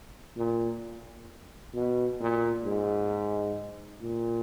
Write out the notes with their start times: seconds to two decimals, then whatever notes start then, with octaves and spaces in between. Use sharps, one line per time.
0.37 A#2
1.74 B2
2.20 A#2
2.64 G#2
4.01 A#2